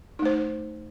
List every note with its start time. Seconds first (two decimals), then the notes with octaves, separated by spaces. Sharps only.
0.19 D#4
0.22 A3
0.25 C5